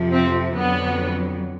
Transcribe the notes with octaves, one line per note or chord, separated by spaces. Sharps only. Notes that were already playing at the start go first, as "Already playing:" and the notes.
Already playing: F2 C3 F3
C4
F2 D3 F#3 B3